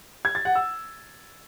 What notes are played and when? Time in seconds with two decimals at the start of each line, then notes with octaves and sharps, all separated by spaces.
0.25 G#6
0.35 A6
0.45 F#5
0.55 E6